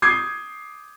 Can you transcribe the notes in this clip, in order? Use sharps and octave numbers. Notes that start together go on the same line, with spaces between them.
D6 D#6 G6 G#6 C7